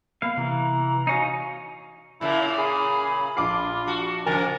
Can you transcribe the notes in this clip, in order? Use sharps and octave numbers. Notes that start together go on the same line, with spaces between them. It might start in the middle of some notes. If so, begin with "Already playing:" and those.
A#3 B3 F5 B5
C3 E3 A#5
D#4 F#4 C#5 F5 G#5 A#6 C7
A#2 C#3 A#3 E4 E5
G#4 B5
A#1 F4 D6 C7
F#4 A5
F2 C#3 A#4 G#5 A6